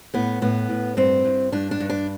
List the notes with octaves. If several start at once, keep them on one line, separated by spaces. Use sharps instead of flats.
A2 B3
A2 B3
A2
G2 C4
G2
G2 D4
D4
G2
D4